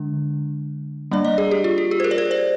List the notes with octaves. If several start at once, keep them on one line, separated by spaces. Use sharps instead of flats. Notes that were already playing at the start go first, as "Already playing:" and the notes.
Already playing: D3 G#3 D4
G3 A#3 D4 D5
D#5
G#4
G4
F4
G4
G#4
C5
A#4
D5
C5
D5